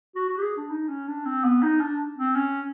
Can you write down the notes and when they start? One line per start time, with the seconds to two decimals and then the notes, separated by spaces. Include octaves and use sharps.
0.15 F#4
0.29 F#4
0.38 G4
0.43 G#4
0.57 D4
0.71 D#4
0.89 C#4
1.08 D4
1.26 C4
1.44 B3
1.63 D#4
1.81 D4
2.18 C4
2.36 C#4